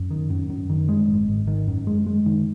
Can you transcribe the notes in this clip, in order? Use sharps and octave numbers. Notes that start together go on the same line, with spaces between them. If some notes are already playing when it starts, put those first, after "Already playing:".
Already playing: F#2
D#3
F#2
F#2
D#3
G#3
G#1
G#1
D#3
F#2
G#3
G#3
D#3